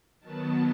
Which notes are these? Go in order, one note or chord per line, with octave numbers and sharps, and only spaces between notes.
D#3 F#3 B3 A5